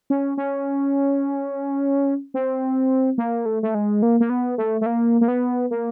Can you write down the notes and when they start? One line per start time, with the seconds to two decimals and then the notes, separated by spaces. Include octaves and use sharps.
0.10 C#4
0.37 C#4
2.34 C4
3.18 A#3
3.46 A3
3.63 A3
3.75 G#3
4.02 A#3
4.20 A#3
4.30 B3
4.58 A3
4.81 A3
4.86 A#3
5.21 A#3
5.28 B3
5.71 A#3